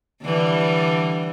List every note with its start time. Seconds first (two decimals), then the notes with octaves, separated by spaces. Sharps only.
0.22 D3 E3 G3